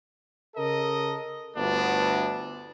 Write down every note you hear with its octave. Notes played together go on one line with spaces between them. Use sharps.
C#3 A4 A#4 D#5
G1 D2 B3 D4